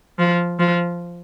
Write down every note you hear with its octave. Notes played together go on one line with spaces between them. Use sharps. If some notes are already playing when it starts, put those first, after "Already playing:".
F3
F3